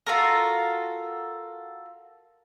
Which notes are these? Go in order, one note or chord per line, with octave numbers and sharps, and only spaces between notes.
F4 F#4 A4 A#4